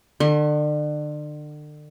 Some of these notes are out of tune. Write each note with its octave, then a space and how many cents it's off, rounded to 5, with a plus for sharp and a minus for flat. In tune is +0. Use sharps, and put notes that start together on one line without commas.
D3 +35 C6 +45